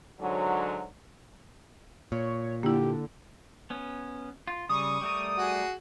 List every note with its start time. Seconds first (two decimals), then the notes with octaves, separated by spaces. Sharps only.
0.21 G#2 D3 F#3
2.12 A#2 C#5
2.63 D3 A#3 E4 G4
3.70 B3 C#4
4.47 F4
4.69 C#3 G3 C#6 D#6
5.01 G3 A3 A#4
5.38 F#4 G#4